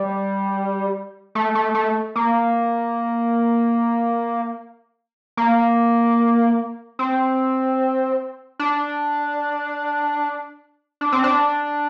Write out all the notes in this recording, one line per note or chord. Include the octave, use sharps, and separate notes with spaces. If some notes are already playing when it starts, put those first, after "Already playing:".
Already playing: G3
A3
A3
A3
A#3
A#3
C4
D4
D4
C4
D4